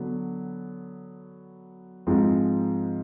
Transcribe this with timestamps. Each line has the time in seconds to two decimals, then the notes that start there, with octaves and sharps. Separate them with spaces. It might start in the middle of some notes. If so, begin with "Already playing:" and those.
Already playing: D3 F#3 B3
2.07 G#2 F3 G#3 C4